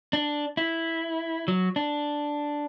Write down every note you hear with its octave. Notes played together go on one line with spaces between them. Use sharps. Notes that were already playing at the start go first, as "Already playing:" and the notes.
D4
E4
F#3
D4